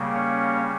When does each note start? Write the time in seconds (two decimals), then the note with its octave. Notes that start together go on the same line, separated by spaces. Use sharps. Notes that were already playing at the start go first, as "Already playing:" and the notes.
Already playing: C#3 G3 A#3
0.14 C#4 C#5